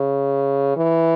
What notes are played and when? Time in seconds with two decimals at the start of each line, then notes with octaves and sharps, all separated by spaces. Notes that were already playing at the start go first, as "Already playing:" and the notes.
Already playing: C#3
0.77 E3